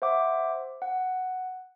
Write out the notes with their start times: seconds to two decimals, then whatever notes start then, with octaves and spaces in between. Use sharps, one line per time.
0.02 C5 E5 F#5 D6
0.82 F#5